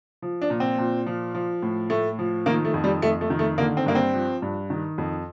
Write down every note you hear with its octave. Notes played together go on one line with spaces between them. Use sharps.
F3
D4
A#2
C4
A#2
F3
F3
A2
A2 A3
F3
D#3 A#3
A3
F2
G3
F2 A3
A3
D#3
A3
D3 A#3
C4
G2 A#3
C4
F3
G2
D#3
F2